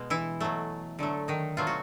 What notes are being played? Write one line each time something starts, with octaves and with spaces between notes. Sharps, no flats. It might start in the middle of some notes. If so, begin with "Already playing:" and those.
Already playing: B2 G#3
E3 E4
B2 F#3 A3
D3 F#3 A3
D#3 D#4
B2 F#3 A3 F4
F#4